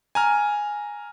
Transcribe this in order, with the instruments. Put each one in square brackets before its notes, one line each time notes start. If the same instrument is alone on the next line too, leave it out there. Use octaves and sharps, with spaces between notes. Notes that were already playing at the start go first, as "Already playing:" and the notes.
[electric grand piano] G#5 A#5 F6